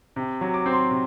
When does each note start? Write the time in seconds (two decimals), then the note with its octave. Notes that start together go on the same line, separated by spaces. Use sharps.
0.16 C3
0.41 F#3
0.54 D6
0.66 C4
0.73 C6
0.91 C3